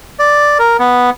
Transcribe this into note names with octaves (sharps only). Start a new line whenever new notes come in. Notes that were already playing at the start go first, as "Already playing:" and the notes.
D5
A#4
B3